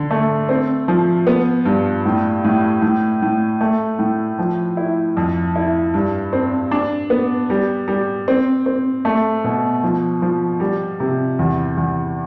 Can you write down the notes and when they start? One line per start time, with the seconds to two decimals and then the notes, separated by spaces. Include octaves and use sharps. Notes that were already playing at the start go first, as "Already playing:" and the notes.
Already playing: D3
0.11 A3
0.49 C4
0.88 F3
1.27 B3
1.66 G2
2.05 A2
2.45 A2
2.82 A2
3.22 A2
3.61 A3
3.99 A2
4.39 F3
4.77 E4
5.17 F2
5.56 E4
5.94 G2
6.33 C4
6.71 D4
7.10 B3
7.50 G3
7.88 G3
8.28 C4
8.66 C4
9.05 A3
9.44 B2
9.83 F3
10.22 F3
10.60 G3
11.00 C3
11.39 E2
11.77 E2